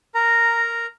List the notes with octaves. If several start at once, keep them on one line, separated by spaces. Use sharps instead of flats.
A#4 A#5